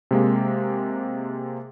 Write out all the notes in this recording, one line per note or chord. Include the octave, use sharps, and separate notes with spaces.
C3 G#3 A#3